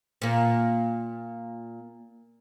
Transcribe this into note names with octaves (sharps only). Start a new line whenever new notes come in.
A#2 A#3